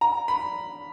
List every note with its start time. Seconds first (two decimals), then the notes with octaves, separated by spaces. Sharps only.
0.01 A#5
0.28 B5